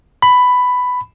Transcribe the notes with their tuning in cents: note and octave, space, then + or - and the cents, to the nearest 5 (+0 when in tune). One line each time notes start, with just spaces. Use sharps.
B5 +10